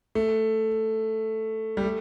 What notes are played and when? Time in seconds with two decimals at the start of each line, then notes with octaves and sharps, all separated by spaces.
0.15 A3
1.77 G3
1.84 A3